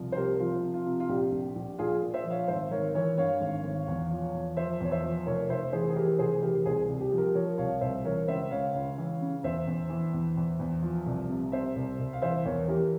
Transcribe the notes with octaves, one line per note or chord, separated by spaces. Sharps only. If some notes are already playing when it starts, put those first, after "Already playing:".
Already playing: C2 F3
C5
C3 G4 A#4
F3 F4
C3
F4
C3
F4
A#1 G4
A#1
A#1
A#1 F4 G#4
A#2
C5 E5
F3
C#5 F5
G#1 C5 E5
G#1 A#4 C#5
E3 A#4 C#5
G2 C#5 F5
G#1
G#1
E2
F3
E2
F3 C5 E5
E2 C#5
C5 E5
F3
F1 A#4 C#5
F1 C5 E5
E3 G#4 C5
G#4
E3 G4 A#4
F1 G#4 C5
E3 G4 A#4
C2 G#4 C5
C2
G4
F3
G4 A#4
F3 A#4 C#5
C2 C#5 F5
C2 C5 E5
E3 A#4 C#5
C#2 C5 E5
C#2 C#5 F5
C#2
E3
C#3
E2 C5 E5
E2
E3
E2
E2
E2
F3
C2
C3
C3 C5 E5
C2
C2
F5
E3 C5 E5
E2 A#4 C#5
E3 G4 A#4